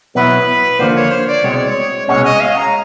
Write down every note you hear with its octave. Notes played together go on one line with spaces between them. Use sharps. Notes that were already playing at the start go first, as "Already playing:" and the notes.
B2 F#3 B3 E4 B4
D3 F3 A#3 C5
C#5
C5
D5
C2 B2 G#3 C4 C#5
D5
C#5
C2 B2 G#3 C#4 F#4 C#5
D#5
F5
A#5